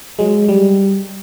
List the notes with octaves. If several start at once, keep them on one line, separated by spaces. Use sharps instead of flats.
F#3 G#3
G3